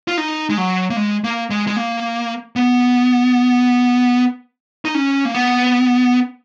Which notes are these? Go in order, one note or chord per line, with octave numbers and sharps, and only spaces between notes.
F4
D#4
G#3
F#3
A#3
G#3
A#3
G#3
G#3
A#3
B3
D#4
C#4
A#3
B3